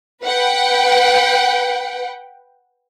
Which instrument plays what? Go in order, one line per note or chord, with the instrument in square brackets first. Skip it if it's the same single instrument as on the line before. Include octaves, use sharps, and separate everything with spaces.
[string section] B4 F#5 G5